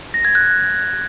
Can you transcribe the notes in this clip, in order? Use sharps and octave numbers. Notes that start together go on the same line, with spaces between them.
A#6
G#6
F#6